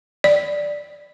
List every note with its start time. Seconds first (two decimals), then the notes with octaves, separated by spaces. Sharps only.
0.24 D5